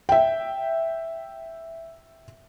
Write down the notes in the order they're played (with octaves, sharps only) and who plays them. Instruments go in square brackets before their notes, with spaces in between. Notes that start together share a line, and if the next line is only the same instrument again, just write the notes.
[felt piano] E5 G5